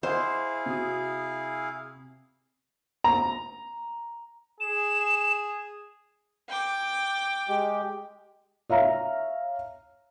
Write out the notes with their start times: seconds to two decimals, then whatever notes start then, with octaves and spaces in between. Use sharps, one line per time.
0.03 E4 G#4 C5 D#5 F5 F#5 C6
0.66 C3 F#4 D#6
3.04 A#5
4.60 G#4 E7
6.49 G5 D6
7.49 G#3 G4
8.69 C#5 E5 F5 A#5